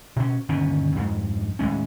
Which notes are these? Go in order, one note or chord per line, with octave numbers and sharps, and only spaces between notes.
B2 C#4
G1 D#2 B2 C#4
F2 G#2
D#2 A2 G#3 C#4